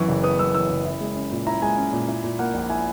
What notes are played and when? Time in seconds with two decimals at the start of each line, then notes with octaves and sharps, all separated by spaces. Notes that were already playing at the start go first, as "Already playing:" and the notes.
Already playing: F#2 E3 B3 C#6
0.09 F#1
0.23 B3 D#6
0.39 F#2 E6
0.54 E3 E6
0.70 F#1
0.85 E4
1.00 G#3
1.15 C#4
1.32 A#2
1.47 E4 A#5
1.62 G#3 G#5
1.78 C#4
1.93 A#2
2.08 E4
2.24 A#2
2.39 A#3 F#5
2.54 A#1
2.70 E4 G#5